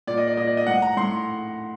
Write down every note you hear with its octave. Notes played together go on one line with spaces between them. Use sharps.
A#2 D5
D#5
D5
A#2 D#5
D5
D#5
A2 F#5
A#5
A2 C6